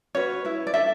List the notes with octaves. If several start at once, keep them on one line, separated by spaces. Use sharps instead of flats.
C#4 F#4 B4 C#5
E4 B4
D5
D4 A4 E5